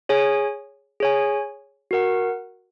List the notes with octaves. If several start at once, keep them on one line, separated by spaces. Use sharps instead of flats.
G#4 C#5 G#5
G#4 C#5 G#5
F#4 A#4 F#5